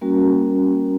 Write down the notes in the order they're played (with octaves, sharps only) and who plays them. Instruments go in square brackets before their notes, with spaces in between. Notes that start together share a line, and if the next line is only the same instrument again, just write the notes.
[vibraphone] G3 A#3 C#4 F#4 A#4